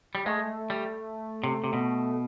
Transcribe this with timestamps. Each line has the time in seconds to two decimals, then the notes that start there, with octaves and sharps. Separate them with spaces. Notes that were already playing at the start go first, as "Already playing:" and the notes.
0.15 G3
0.26 G#3 A3
0.70 G3
1.44 C3
1.64 C3
1.73 B2